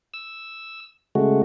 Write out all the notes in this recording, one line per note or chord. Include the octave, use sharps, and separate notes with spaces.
E6
C#3 G#3 A3 F#4